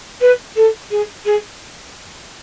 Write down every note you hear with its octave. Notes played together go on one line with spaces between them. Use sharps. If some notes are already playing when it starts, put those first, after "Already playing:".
B4
A4
G#4
G#4